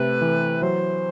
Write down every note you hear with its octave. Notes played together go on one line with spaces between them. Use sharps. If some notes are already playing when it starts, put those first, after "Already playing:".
Already playing: C3 A3 B4
E3
F#3 C5